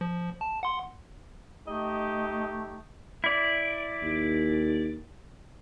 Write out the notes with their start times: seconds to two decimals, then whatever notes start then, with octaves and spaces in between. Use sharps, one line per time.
0.01 F3
0.41 A5
0.63 F#5 C6
1.68 A3 D#4 G4 D#5
3.24 E4 D5
4.03 D#2